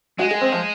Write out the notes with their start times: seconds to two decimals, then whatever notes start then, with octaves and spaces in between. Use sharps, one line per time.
0.19 G#3 F#4
0.31 G#4
0.41 C4
0.52 F3